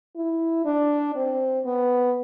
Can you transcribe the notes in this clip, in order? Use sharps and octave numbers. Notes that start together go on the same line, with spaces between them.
E4
D4
C4
B3